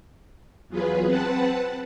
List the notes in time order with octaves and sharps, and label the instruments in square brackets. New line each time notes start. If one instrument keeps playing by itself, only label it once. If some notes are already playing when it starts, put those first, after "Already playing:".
[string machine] E2 F#3 F4 G#4 B4
C4 B4 F#5 A5